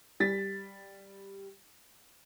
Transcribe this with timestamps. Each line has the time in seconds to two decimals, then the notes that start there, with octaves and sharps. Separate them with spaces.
0.20 G3 A6 B6